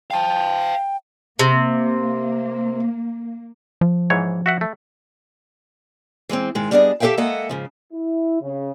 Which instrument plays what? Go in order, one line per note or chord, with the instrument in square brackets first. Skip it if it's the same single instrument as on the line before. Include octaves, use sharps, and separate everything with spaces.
[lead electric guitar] F5 A5 [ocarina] G5
[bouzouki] C3 [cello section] A#3
[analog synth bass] F3
[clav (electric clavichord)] G#2 E3 C#5
F#4 E5 F#5
A3
[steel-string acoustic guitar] E3 G#3 A#3 C4
G#2 D#3 G#3
G3 B3 D4 G#4 D5 D#5
G4 A4 C5 E5 F5 G5
G#3 A#3 A4 D#5 E5 F#5
G#2 C#3 F3
[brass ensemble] E4
C#3